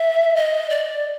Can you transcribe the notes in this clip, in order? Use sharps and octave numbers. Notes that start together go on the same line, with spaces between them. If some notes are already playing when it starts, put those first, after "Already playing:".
Already playing: E5
D#5
D5